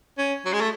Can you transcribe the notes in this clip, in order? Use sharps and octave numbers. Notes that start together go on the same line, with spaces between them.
C#4
F#3
G#3
A3